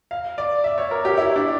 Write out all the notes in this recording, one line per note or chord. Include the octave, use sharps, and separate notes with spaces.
F5
D5
E5
C#5
A#4
G4
E4
D4